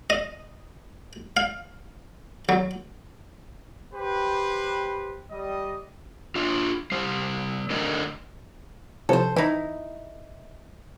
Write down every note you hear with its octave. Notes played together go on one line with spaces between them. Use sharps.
D#5
F5
F#3
G4 B4 C5
G3 D#5
D4 F4
G3 C5
D3 A3 A#4 D5 D#5
C3 E3 F3 A4 C5
E3 D#4 E4